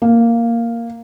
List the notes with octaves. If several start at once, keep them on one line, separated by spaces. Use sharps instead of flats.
A#3